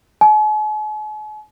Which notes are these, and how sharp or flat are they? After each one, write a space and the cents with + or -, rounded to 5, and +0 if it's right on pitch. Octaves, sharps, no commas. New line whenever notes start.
G#5 +45